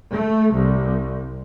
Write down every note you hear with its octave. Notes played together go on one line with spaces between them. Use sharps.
A3
C2